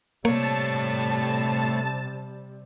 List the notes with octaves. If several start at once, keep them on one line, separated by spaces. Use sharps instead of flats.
C3 G3 A3 A#3 C#5 A5